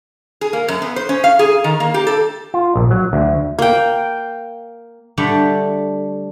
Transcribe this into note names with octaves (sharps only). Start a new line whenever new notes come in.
G#4
A#3
F#2
B3
C5
C#4
F5
G#4
D#3
A#3
G4
A4
F4
A#1
F#3
D2
A#3 G5
D3 G3 A3